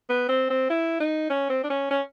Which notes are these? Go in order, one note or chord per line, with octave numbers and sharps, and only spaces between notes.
B3
C4
C4
E4
D#4
C#4
C4
D4
C#4
C#4